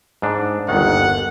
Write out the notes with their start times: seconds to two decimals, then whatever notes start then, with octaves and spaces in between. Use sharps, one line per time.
0.22 G#2 D4
0.69 G1 D#2 D#3 F#5